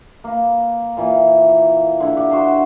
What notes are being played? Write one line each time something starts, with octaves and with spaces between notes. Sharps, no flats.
A#3 B4
A#2 E3 A#3
D3 E4
G4 F#5
F#4 C5 C6